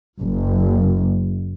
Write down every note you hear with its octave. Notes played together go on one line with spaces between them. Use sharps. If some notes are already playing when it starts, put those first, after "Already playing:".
F#1